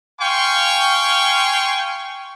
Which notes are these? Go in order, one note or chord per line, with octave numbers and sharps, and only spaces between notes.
F5 G5 G#5 C6 C#6